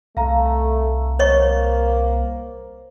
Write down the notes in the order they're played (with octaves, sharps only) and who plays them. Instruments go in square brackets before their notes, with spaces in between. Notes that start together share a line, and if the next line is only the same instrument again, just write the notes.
[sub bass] C2 [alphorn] A3 [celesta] F5 A#5
[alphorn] A#3 [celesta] C5 [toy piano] C#5 D#5 C#6